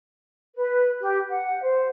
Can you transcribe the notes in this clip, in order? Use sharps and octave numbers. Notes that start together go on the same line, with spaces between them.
B4
G4
F#5
C5